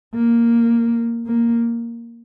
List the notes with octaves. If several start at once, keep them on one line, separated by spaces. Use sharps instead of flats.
A#3
A#3